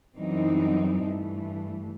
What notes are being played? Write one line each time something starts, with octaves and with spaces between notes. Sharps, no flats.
F#2 E3 G3 C4 D#4
G2 E3 A3